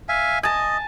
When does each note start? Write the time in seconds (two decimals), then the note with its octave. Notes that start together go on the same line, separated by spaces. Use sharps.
0.09 E5 F5 G#5
0.43 D#5 G#5 A5